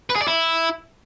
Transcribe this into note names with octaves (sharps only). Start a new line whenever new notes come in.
B4
G#4
D5
E4